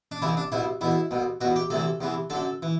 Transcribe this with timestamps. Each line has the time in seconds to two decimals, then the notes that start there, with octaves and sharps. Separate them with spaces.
0.12 D4
0.22 C2 C3 E3 E4
0.37 D4
0.52 C2 B2 E4
0.81 E2 B2 E4
1.11 C2 B2
1.41 B2 F#4
1.45 E2
1.56 G4
1.70 D2 C3 E3 A4
2.01 E2 C3 E3
2.30 F#2 D3 A4
2.62 E3